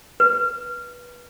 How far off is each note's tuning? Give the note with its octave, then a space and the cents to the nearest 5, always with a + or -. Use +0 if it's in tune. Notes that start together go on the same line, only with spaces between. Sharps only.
B4 -20